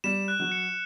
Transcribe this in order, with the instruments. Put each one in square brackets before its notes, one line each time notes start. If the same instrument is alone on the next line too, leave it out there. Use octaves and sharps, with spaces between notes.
[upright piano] G3 [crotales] E7
[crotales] F#6
[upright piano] F#3
[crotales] C#7